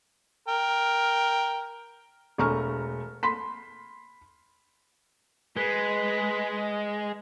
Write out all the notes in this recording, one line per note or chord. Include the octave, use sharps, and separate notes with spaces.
A#4 G5
E1 A3 A#5 C#6 F6
B5 C6 B6
G#3 B4